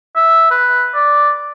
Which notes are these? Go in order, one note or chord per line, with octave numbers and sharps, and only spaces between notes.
E5
B4
D5